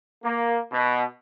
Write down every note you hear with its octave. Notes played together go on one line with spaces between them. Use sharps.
A#3
B2